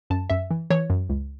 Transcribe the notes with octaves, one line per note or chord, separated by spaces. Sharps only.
F#2 A5
F#2 E5
E3
E3 C#5
F#2
C#2